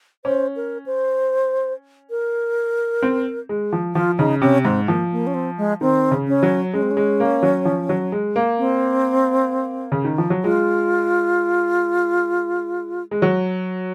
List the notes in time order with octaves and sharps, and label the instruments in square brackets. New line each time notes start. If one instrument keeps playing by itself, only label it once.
[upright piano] C#4 [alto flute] C5
[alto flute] A#4
C5
A#4
[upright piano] C4
G#3
F3
[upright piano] F3 [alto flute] F4
[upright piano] C#3 [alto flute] D#4
[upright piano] C3 [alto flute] C#4
[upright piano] G#2 [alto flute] C4
[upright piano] F3 [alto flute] A#3
[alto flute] A#3
C#4
C4
G#3
[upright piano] D#3 [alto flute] C4
[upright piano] C#3
[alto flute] C#4
[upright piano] F#3
[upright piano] G#3 [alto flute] C#4
[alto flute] C4
C#4
[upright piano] G#3
A#3
F#3
F3
F#3
G#3
A#3
[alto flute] C4
[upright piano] C#3
D#3
F3
F#3
[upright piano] G#3 [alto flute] F4
[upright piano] G#3
F#3